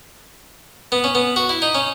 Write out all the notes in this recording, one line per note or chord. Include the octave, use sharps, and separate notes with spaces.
B3
C#4
B3
F#4
E4
D#4
C#4